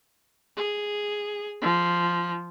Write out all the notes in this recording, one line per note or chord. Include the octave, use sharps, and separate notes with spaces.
G#4
F3